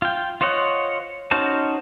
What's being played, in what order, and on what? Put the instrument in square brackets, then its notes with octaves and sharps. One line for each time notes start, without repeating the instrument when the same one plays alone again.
[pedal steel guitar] F4 G5
F4 C5 C#5 D#5 F#5
C#4 D#4 F#4 C5 A5